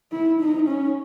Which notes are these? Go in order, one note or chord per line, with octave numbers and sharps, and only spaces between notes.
E4
D#4
C#4